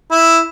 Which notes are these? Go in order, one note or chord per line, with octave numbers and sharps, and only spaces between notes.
E4